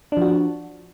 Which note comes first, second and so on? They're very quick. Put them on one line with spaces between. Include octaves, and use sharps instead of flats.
D4 F3 F#4